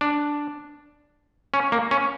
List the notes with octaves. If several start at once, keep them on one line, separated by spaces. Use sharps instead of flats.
D4
C#4
A#3
C#4